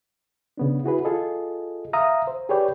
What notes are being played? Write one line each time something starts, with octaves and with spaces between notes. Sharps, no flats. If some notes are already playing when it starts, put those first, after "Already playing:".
C#3 B3 D4
E4 F#4 G#4 B4
F4 G#4 A4 D#5
E5 F5 A#5 D#6
C5
G4 G#4 B4 C#5 D5 G5